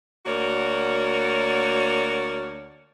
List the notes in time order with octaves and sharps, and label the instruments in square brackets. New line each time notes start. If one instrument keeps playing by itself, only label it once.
[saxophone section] D2 A#3 F#4 A#4 C#5 D5